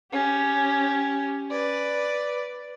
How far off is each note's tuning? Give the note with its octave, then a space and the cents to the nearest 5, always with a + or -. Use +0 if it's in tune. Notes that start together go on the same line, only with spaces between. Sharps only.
C#4 +10 G4 +0
B4 +0 D5 +0